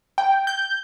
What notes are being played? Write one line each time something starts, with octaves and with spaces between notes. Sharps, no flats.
G5
G6